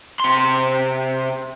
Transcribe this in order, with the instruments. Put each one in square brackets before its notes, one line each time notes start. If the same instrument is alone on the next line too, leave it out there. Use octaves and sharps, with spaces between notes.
[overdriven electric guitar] C3 C6